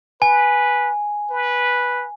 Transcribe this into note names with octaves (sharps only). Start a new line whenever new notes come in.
B4 G#5
B4